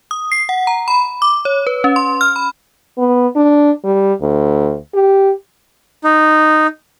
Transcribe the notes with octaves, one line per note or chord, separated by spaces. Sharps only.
D#6
C7
F#5
A#5
B5
D6
C#5
B4
C#4
C6
F6
B5
B3
D4
G3
D2
G4
D#4